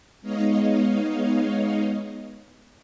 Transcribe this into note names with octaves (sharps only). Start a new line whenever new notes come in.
G#3 B3 D#4 C#5 D#5 F5